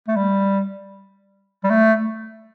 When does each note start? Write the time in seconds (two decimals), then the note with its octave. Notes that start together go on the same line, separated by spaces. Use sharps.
0.08 A3
0.16 G3
1.64 G3
1.70 A3